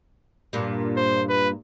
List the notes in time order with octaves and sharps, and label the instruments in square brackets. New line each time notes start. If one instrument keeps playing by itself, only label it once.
[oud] G2 A#2
[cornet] C5
B4